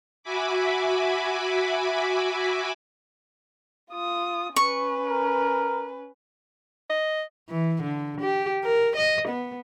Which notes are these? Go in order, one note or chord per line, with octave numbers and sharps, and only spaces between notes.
F#4 E5 G#5 B5 D6
F4 D#6
C#4 B4 C#6
A#4
D#5
E3
D3
G4
A#4
D#5
B3